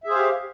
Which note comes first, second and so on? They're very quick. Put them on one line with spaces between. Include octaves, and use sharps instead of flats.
E5 G#4 C5 F5 G4